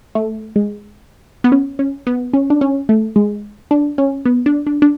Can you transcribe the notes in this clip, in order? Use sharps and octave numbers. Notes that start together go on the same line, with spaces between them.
A3
G#3
B3
C#4
C#4
B3
C#4
D4
C#4
A3
G#3
D4
C#4
B3
D4
D4
D4